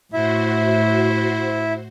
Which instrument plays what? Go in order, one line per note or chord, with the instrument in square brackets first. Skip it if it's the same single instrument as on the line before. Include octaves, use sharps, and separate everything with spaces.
[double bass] A2 [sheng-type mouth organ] E4 E5 [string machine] F#4 C5